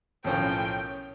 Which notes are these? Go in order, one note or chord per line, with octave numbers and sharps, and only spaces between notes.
B1 A2 F3 A#3 C#4 G5